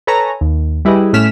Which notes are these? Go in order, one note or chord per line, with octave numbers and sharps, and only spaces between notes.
A4 B4 C#5 G#5 A#5
D#2
G3 E4 G4 G#4 B4 D#5
A2 A3 C#4 F6 B6 E7